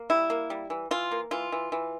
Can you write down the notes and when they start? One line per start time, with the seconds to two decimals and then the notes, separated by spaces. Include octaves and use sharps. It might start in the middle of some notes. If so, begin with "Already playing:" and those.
Already playing: A#3
0.10 G3 E4
0.30 A#3
0.50 G3
0.70 E3
0.91 E3 F4
1.11 A#3
1.31 E3 F4
1.52 E3
1.72 E3